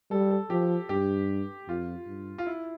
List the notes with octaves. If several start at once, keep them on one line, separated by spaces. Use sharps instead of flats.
G3 A4
A4
F3 G4
G2 G4
F2 F4
G2
F4
E4